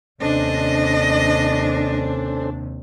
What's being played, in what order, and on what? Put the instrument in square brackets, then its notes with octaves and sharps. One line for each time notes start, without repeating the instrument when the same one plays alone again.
[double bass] D#2 C3 [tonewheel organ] C#4 A4 C5 [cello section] D4 [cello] D#5